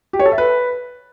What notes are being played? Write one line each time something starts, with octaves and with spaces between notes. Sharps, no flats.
G4
C#5
A4
E5
B4